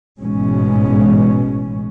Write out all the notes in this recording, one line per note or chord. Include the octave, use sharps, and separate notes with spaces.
A1 G#2 B2 E3 G#3 C#4